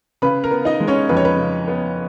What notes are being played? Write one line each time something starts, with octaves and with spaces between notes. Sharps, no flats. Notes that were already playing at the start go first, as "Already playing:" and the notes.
C#3 B4 B5
A#4 A#5
B3
D#4 D#5
G#3
C#4 C#5
F2 B4
C#5
B4
C#3
B3